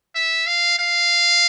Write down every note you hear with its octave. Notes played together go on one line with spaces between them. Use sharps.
E5
F5
F5